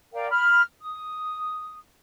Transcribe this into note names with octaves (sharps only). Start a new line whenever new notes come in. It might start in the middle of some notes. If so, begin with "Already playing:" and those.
A#4 D5 F5 G5
B5 F6
D#6